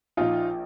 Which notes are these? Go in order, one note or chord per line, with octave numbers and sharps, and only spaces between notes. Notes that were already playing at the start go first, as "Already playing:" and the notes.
A#1 A#2 F3 D#4 F4